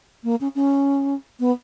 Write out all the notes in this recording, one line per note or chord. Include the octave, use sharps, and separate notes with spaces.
A#3
C#4
C#4
B3